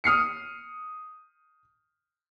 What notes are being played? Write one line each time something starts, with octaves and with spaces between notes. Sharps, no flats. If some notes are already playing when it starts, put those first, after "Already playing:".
D#6 F6 C7 C#7